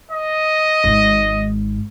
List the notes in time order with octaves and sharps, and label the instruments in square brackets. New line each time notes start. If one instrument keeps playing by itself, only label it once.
[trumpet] D#5
[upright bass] G#1 G#2